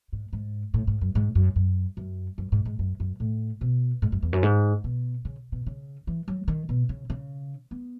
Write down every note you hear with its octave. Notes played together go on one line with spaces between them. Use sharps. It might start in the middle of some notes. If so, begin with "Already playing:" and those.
G#2
G#2
A2
G#2
F#2
G#2
F#2
F#2
F#2
F#2
G#2
G#2
F#2
F#2
A2
B2
G#2
F#2
E2
F#2
G#2
B2
C#3
B2
C#3
E3
F#3
D#3
B2
C#3
C#3
B3